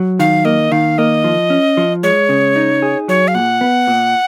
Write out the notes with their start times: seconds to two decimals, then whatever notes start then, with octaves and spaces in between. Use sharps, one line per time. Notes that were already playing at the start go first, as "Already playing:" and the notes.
Already playing: F#3
0.19 D#3 F5
0.45 A#3 D#5
0.72 D#3 F5
0.98 A#3 D#5
1.24 F3
1.50 C#4
1.77 F3
2.03 G#3 C#5
2.29 C#3
2.56 D#4
2.82 G#4
3.08 F#3 C#5
3.28 F5
3.35 A#2 F#5
3.61 B3
3.88 A#2